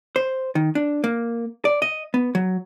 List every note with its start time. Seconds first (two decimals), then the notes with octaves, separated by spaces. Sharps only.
0.16 C5
0.55 D#3
0.75 D4
1.04 A#3
1.65 D5
1.82 D#5
2.14 B3
2.35 F#3